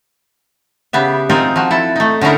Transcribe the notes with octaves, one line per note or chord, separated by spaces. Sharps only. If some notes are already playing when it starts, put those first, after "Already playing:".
C#3 B3 G4 E5
C4 D#4 F4 G#4 A#4
F3 F#4
E4 A4
A3 D#4
D3 C#4 D#4 E4 A#4